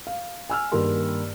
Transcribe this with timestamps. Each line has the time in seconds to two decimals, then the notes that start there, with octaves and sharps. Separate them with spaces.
0.07 F5
0.49 G#5 E6 F6
0.72 G2 D#3 A#3 G4 A#4 C6